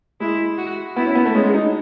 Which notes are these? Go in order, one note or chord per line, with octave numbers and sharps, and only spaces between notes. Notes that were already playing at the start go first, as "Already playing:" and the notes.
G#3 E4
F#4
B3 E4
C#4
B3
A3
G#3 C#4
D#4